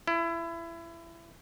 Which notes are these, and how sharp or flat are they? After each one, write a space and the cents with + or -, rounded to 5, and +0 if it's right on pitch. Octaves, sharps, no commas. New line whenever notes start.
E4 +25